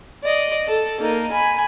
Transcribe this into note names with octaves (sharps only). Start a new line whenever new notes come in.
D5 D#5
A4
A#3 D#4
G#5 B5